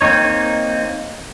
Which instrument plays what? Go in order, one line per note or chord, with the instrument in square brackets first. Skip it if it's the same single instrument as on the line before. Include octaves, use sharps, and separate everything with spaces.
[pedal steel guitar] A#3 C4 D#4 C#5